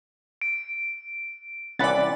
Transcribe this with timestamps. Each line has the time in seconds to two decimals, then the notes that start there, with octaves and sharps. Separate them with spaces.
0.41 D7
1.79 C2 C3 E3 C#4 D5 F#5 B5 A6